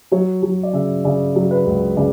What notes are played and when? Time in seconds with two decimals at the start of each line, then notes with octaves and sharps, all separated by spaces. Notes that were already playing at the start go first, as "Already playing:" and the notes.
0.12 F#3 C#5
0.43 F#3
0.63 D5
0.73 C#3 E5
1.04 C#3 D5
1.36 F#3
1.51 B4
1.66 C#2
1.97 C#3 D5